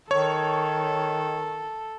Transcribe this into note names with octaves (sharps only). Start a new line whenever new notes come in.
D#3 A4 C#5